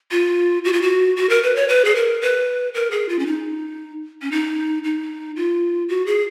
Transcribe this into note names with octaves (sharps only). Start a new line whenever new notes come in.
F4
F#4
F4
F#4
F#4
A#4
B4
C#5
B4
G#4
A#4
B4
A#4
G#4
F4
C#4
D#4
C#4
D#4
D#4
F4
F#4
G#4